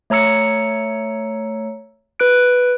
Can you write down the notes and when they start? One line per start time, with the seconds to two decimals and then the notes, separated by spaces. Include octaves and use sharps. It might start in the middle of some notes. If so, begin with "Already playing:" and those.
0.10 A3 C#5 A#5 E6 C#7
2.20 B4 F#6 D7